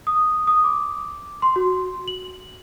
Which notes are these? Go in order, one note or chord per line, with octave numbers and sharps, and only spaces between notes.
D#6
D#6
D6
C6
F#4
F#7